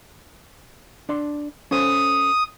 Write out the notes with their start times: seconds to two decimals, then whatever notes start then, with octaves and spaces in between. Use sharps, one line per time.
1.09 D4 D5 C6
1.71 C#4 A4 C5 D#6